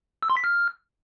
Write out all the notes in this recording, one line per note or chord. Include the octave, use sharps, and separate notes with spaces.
E6
C6
B6
F6